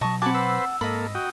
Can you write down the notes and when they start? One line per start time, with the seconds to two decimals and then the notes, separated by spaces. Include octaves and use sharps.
0.01 B2 F#3 D#5 A5 C#6
0.22 C4 F#4 F#5 G#5 A5 B5 D6
0.34 B4 C5 E6
0.81 G#2 A#3 A4 D#5 B5
1.15 F#4 G5 D#6